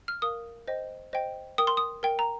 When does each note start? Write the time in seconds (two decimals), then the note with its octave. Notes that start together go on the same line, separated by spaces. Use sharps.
0.08 F6
0.22 A#4 F5 D#6
0.68 C5 D#5 G5
1.13 C5 D#5 G5
1.58 A#4 G5 D#6
1.67 C6
1.77 D#6
2.03 A#4 G5
2.19 A#5